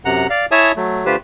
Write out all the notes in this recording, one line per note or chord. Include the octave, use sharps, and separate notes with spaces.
F#2 C3 F#5 A#5
D5 F5
E4 C#5 E5 G#5 A5 D#6
F#3 A3
D3 A3 F4 G4 B4 C5